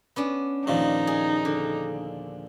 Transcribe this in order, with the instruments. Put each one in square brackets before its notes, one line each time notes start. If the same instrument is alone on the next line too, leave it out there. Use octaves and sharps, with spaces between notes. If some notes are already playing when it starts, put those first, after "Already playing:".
[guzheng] B3 C#4 D4
[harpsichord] D#2 A#2 F3 [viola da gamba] D#4
[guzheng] G#4
D3